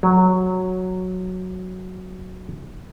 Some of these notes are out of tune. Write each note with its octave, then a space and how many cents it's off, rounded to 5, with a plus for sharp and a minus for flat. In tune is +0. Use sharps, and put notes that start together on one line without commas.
F#3 -5